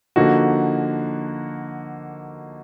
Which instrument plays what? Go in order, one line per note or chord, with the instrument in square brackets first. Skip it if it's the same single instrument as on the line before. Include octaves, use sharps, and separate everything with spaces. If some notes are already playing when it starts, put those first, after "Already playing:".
[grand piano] D3 F3 A#3 D#4 F#4